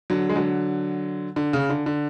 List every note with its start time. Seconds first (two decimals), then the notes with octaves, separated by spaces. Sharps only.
0.10 D3 F#3
0.29 G#3
0.36 D3 F#3
1.36 D3
1.53 C#3
1.70 D3
1.86 D3